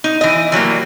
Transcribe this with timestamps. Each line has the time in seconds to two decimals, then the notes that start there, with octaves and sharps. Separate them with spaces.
0.04 D#4
0.21 E3 D#5
0.52 E3 F#3 G3 A#3